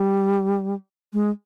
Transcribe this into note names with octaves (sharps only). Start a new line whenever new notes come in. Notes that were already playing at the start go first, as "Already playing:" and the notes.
Already playing: G3
G#3